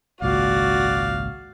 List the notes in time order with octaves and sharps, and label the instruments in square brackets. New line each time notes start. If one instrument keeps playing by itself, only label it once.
[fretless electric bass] G#1 C#2 A#2 [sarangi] F#4 [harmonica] D5 F5